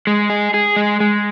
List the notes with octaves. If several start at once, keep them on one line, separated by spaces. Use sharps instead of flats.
G#3
G#4
G#4
G#3
G#3